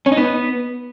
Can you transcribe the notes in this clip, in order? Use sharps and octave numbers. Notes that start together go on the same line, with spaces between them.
C#4
D#4
B3